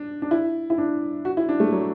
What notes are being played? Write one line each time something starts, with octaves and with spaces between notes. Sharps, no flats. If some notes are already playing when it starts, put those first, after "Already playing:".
Already playing: D4
D4
E4
E4
D4
F#4
E4
D4
A3
F#3